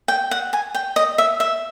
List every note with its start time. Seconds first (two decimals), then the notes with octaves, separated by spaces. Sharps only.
0.08 G5
0.31 F#5
0.53 G#5
0.75 G5
0.96 D#5
1.18 E5
1.40 E5